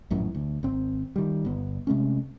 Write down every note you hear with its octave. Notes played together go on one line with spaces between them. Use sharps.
A#1 F#2 A2 E3
D2
G#1 C4
D#3 G3
G1 B3
C3 G#3 A3 C#4